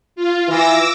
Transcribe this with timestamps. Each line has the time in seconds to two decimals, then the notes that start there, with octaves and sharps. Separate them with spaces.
0.16 F4
0.48 E3 D6 E6 A#6